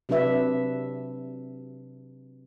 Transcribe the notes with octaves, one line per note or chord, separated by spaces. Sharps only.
C3 F#3 D4 B4 E5